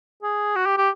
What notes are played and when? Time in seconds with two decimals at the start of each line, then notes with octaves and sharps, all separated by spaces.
0.22 G#4
0.55 F#4
0.66 G4
0.78 G4